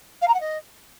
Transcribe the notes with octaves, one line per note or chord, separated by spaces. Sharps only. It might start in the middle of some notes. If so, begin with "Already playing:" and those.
F5
A#5
F#5
D#5